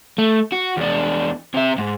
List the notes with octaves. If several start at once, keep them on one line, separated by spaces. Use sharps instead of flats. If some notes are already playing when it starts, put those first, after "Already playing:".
A3
F#4
E2 D4
C3 E5
G#2